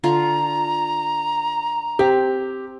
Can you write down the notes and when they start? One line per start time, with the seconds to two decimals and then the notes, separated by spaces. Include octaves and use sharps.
0.04 D3 F4 A#5 C#6
1.99 C4 G4